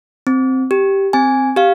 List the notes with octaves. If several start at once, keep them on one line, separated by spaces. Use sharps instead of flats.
C4
G4
C4 G#5
G4 F5